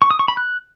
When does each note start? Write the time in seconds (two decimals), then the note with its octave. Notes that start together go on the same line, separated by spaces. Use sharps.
0.02 C#6
0.11 D#6
0.19 C#6
0.28 B5
0.37 F#6